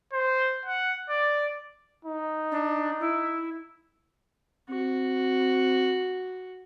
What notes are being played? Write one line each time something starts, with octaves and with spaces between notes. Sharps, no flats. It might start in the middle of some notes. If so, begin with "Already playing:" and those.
C5
F#5
D5
D#4
D4
E4
C4 F#4